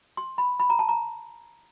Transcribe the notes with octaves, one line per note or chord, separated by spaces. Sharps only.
C6
B5
B5
A#5
A5
A#5